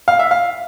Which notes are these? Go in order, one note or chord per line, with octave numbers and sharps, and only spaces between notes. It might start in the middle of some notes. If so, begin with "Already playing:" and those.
F5
E5
F5